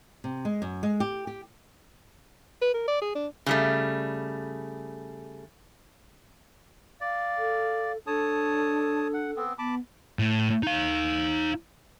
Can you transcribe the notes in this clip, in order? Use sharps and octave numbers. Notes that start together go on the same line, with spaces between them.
C3
G#3
F#2
G#3
G4
G4
B4
A#4
D5
G#4
D4
C#3 G3 A3
D5 F5
A4
D4 A4 C#5 A5 D#6
F#5
B3 C4
B3 A5 B5 D6
A2
D#4 F5